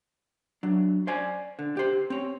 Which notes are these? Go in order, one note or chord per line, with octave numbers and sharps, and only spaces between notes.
F#3 D4
C5 D5 G#5
D3
G4 C5
C4 C#5